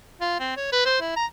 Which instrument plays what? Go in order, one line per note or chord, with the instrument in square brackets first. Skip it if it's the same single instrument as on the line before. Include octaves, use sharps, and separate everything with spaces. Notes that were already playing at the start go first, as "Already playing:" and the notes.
[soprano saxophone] F4
C4
C#5
B4
C5
E4
A#5